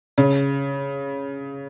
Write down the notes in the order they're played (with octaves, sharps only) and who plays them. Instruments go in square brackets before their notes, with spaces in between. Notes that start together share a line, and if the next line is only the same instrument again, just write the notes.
[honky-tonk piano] C#3